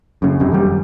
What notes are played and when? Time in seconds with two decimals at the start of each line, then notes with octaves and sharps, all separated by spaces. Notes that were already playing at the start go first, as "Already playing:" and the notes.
0.22 F#2 C#3
0.40 F1 F#2 C3
0.52 D#3 G3
0.66 F#2